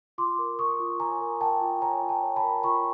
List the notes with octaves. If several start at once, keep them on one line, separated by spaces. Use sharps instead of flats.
F4 C6 D6
A#4
F4 C#6 D#6
F4
C#5 G#5 A#5
A#4
A#4 G5 A5
F4
C#5 G#5 A#5
F4
G5 A5
C#5
A5 B5
A#4
F4 B5 C#6